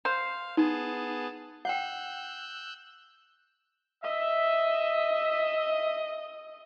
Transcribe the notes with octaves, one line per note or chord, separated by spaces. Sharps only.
C5 F5
B3 D#4 G#4 A5
F#5 G5 E6 F#6 G6
D#5 E5